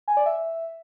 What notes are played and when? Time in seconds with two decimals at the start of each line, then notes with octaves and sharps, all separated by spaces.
0.08 G#5
0.17 D5
0.26 E5